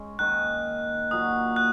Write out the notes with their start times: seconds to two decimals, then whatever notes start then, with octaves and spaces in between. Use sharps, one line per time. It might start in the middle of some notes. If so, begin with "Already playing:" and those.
Already playing: G#3 C#4
0.19 D#3 A#3 D#4 A#4 F#6
1.11 A#2 F#3 A#3 D#6
1.56 F#6